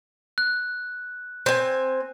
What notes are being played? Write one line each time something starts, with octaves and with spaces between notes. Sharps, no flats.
F#6
C4 G#5